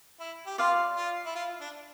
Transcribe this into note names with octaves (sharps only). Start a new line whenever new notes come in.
E4
G4
F4 D5 F5 C6
F4
E4
F4
D4